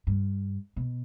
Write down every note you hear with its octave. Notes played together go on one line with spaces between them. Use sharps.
G2
B2